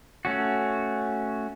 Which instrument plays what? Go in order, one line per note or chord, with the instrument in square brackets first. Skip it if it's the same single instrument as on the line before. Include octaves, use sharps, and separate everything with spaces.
[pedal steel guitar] A3 C#4 F#4